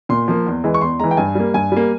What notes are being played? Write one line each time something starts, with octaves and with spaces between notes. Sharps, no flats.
A#2 C6
F3 A#3
E2
E3 G#3
C#6
E2 C6
E3 G#3 A#5
G5
G2 G#5
G3 A#3
G2 G#5
G3 A#3